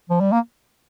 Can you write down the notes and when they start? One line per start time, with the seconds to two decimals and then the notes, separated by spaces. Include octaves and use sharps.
0.10 F3
0.21 G3
0.32 A#3